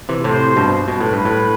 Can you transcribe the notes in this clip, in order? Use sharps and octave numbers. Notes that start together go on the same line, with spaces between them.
C3 E3
A2 C3 C5
G2 B2
B2 B4
A2
G2
A2